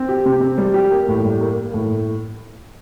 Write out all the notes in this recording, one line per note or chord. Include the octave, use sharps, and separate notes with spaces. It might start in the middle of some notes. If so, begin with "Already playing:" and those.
Already playing: C4
G4
C3
C4
G3
G4
A#3
A2
G3
A#3
A#3
A2